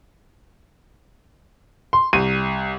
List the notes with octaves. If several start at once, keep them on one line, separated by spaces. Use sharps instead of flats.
C6
C2 D#7